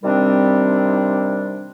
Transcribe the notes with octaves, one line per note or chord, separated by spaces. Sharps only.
C3 D#3 G3 C4 D4